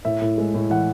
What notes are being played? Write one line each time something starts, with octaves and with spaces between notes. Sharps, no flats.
A2 E5
A2
G#3
A2
E3 F#5